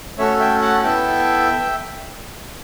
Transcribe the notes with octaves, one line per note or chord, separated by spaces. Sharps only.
A3 C#4 F#4 A4 C#5 E5
E5 G5
F#5 A5
B3 E4 A4 E5 G5